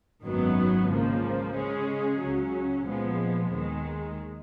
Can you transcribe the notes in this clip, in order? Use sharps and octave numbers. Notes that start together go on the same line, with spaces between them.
G#1 F#2 D#3 F#3 B3
C#2 C#3 F3 A#3
C#3 G#3 C#4 G#4
C#2 C#3 F#3 C#4
A#2 F3 G#3 B3
D#2 D#3 G#3